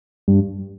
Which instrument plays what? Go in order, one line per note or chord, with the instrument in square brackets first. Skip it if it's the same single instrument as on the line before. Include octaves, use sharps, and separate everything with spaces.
[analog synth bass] G2